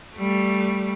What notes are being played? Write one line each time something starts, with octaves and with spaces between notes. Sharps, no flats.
G3 A3